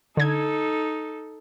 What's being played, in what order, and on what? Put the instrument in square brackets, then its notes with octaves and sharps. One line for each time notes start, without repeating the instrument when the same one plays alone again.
[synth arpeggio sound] D3 G#6 [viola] D#4 A4